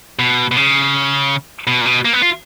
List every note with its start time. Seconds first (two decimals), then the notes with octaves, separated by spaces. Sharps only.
0.19 B2
0.51 B2
0.57 C#3
1.67 B2
1.81 A#2
1.86 B2
2.05 A#3
2.13 B3
2.22 F4